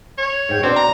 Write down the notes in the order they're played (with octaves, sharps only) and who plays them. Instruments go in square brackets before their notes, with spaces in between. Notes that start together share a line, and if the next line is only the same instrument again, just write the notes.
[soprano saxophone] C#5
[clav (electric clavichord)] G#2 G5
[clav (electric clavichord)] B2 D4 [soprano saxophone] C4
[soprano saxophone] A#5